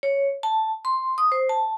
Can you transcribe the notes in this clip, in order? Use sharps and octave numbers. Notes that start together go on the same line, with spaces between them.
C#5
A5
C6
D#6
C5
A5